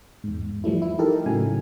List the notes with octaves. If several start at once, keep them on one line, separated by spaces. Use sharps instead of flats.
E2 G#2
E3 F3 G3 A3 E4
E4
D#4 E4 G4 A4 A#4
A2 C#3 F#3 G#5